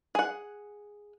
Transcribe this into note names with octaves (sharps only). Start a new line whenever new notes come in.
G#4 F#5